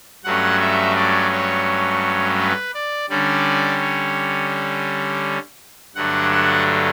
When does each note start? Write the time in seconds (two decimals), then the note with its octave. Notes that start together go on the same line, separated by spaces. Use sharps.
0.24 G2 F#3 A3 C#4 F#5
0.61 E5
0.95 D5
1.32 C#5
2.39 B4
2.74 D5
3.10 D3 G3 C#4 D5
3.81 C#5
5.95 G2 D3 F#3 A3 D4 F#5
6.31 F#5